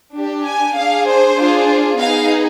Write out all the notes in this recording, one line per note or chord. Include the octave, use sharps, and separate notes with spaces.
D4 G4
G#5
D4 G#4 F5
C5
D4 F4 G#4
B3 D#4 G#4 F5